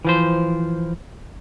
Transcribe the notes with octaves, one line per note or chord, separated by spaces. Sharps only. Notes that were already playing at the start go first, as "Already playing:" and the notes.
E3 F3 C5